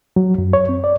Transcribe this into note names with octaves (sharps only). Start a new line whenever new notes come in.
F#3
F#2
C#5
C4
D5